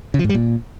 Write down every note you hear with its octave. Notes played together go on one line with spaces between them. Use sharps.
C#3
F3
G#2
G3
A#2